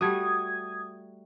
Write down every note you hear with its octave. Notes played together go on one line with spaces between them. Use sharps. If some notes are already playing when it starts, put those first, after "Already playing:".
G3 A3 F#4 D#6 G#6